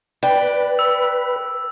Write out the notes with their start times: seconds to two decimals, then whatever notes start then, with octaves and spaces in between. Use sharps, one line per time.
0.23 B4 D5 G5
0.79 E6